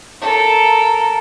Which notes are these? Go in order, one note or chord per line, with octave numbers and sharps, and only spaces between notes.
A4 A#4